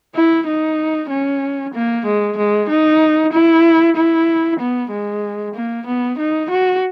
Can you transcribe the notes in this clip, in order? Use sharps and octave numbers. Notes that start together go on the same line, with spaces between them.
E4
D#4
C#4
A#3
G#3
G#3
D#4
E4
E4
B3
G#3
A#3
B3
D#4
F#4